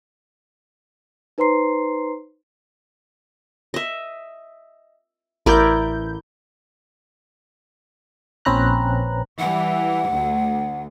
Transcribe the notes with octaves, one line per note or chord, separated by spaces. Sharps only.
D#4 B4 C5 A#5 C6 C7
D#5 E5
A1 E4 A#4 D5 G6
A#1 C4 C#4 B4 A#5 F#6
E3 G3 F#5
D2